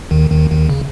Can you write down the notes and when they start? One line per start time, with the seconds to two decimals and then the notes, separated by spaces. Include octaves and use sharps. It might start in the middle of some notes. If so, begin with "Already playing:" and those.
0.11 D#2 D#3
0.31 D#2 D#3
0.50 D#2 D#3
0.70 C#3